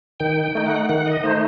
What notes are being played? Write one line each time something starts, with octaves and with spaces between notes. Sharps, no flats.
D#3 G5
G5
A3 D#4 G5
F#5
D#3 F#5
D#5
A3 D#4 C5